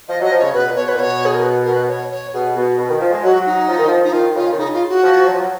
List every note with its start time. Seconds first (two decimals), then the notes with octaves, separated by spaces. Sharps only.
0.08 F3 D#5
0.21 F#3 D#5
0.31 F3
0.39 C#3 C#5
0.54 B2 B4
0.68 A#2
0.76 B2 C#5
0.88 B4
0.94 A#2
0.99 B2 C#5
1.25 G#4
1.34 A#4
1.43 B4
1.64 A#4
1.73 B4
1.88 C#5
2.11 C#5
2.33 B2 G#4
2.56 B2 F#4
2.78 B2
2.89 D#3
3.01 F3
3.12 G#3
3.23 F#3 F#4
3.46 D#4
3.69 F3
3.78 D#3
3.87 F3
4.04 D#4
4.13 D#3 F4
4.36 C#3 F4
4.52 D#3
4.58 C#3 D#4
4.73 F4
4.89 F#4
5.04 F3
5.26 F#3
5.33 F3
5.40 F#3